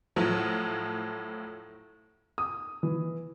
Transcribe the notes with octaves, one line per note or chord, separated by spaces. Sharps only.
A2 F3 F#3
D#6
E3